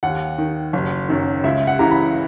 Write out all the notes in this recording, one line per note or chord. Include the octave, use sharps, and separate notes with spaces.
D#2 F#5
D#3
F#1
F#2 D#3
C#2 E5
F#5
C#3 E3 A#5
B5